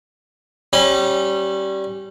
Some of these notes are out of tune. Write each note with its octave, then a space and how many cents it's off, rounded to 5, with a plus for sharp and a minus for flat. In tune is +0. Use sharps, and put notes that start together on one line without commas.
G3 -20 C#4 -30